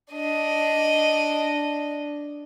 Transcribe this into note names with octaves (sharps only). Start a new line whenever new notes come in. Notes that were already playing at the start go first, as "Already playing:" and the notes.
D4 D#5